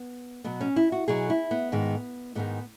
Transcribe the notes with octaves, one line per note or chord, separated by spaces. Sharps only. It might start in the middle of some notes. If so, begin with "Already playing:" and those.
Already playing: B3
B2 F#3 B3
C#4
E4
F#4
B2 F#3 G#4
E4
B3
G#2 D#3 G#3
G#2 D#3 G#3 B3